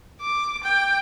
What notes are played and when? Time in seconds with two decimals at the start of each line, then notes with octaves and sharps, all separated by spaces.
0.21 D6
0.63 G5